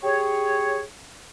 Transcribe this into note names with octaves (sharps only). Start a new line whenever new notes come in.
G4 G#4 C#5